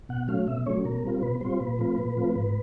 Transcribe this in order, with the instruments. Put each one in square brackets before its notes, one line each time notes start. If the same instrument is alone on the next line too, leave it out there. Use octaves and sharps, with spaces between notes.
[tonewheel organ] B2 F#5
F#3 A3 C#4 F5
B2 E5
F#3 A3 C#4 C#5
B2 A#4
G3 C4 F4
B2 B4
G3 C4 F4 C5
A#2 B4
F3 A3 C4 F4
A#2
F3 A3 C4 F4
G#2